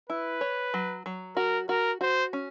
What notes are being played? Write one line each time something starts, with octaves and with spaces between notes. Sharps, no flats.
E4 B4
C#5
F#3
F#3
F#4 A#4
F#4 A#4
F#4 C5
C#4